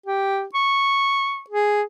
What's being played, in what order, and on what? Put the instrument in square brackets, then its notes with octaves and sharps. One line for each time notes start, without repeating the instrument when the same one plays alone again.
[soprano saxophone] G4
C#6
G#4